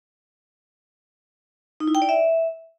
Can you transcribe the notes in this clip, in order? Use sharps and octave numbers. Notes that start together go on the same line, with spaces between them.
D#4
E4
G5
D5
E5